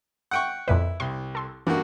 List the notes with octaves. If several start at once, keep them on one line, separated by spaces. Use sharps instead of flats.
F#5 G5 C#6
F2 A#2 E4 B4
C2 C6
A4 C6
G2 E3 A#3 F#4